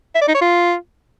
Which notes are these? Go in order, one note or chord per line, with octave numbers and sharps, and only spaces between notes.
E5
D5
D#4
C#5
F4